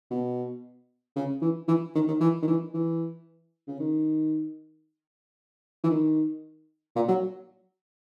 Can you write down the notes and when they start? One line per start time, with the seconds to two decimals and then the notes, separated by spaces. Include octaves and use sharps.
0.11 B2
1.16 C#3
1.42 E3
1.68 E3
1.95 D#3
2.08 D#3
2.20 E3
2.42 D#3
2.48 E3
2.74 E3
3.68 C#3
3.80 D#3
5.83 E3
5.90 D#3
6.96 A#2
7.08 F#3